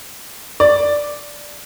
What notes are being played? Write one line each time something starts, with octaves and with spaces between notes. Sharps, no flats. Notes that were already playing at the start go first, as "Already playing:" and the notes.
D5